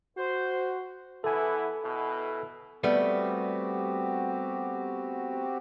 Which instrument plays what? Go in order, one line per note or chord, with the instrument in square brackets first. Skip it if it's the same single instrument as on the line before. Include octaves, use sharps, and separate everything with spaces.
[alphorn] F#4 [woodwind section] C5
[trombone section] E3 B3 E4 [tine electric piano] A4 G#5
[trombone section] B2 E4
[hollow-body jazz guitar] G3 A3 B3 [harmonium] C4 F#4 G4